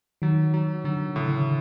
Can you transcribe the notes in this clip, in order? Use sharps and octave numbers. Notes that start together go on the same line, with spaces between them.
D#3 F#3
F#3
D3 F#3
A2 C#3